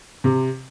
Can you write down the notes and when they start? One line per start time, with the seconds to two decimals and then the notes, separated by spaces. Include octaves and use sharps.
0.24 C3